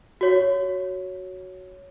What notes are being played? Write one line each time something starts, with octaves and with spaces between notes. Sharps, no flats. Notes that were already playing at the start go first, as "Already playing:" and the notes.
F#4 C#5